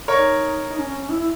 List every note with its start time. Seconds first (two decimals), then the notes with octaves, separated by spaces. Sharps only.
0.08 D#4 A#4 C#5
0.69 D#4
0.79 C#4
0.89 C#4
0.99 C#4
1.09 E4
1.20 E4